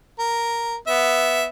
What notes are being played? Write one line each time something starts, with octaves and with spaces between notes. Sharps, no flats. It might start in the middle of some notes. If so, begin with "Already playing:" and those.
A#4
B3 E5